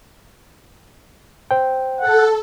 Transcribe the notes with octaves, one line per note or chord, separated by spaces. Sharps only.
C5 G5
A4 F#5